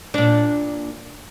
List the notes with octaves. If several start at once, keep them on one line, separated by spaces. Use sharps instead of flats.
A#2 D4